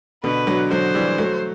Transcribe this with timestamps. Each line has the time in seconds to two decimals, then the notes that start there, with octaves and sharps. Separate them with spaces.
0.24 B2 D3 B4
0.47 D3 F#3
0.70 D3 F#3 C5
0.94 E3 G3
1.18 F#3 A3